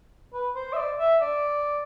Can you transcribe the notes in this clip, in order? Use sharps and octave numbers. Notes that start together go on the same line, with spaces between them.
B4
C5
E5
D5
E5
D5